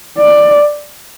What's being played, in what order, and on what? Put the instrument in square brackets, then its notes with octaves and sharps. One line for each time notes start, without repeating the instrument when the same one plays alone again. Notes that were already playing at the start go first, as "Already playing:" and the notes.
[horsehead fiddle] D5